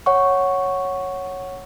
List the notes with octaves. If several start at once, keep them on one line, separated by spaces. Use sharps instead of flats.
C#5 F#5 C#6